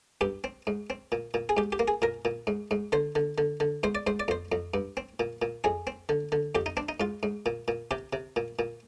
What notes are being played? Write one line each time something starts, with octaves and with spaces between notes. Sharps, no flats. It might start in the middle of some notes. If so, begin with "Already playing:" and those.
G2 G4
C4
G#2
C4
A#2
A#2
G#4
G#2 G4
G4
A#3
G#4
A#2 A#4
A#2
G#2
G#2
D3 C5
D3
D3
D3
G#2 C5
D5
G#2 C5
D5
F2 C5
F2
G2
C4
A#2
A#2
F2 G#4
C4
D3
D3
F2 G4
D#4
C4 D4
D#4
G#2 F4
G#2
A#2
A#2
C3 G4
C3
A#2
A#2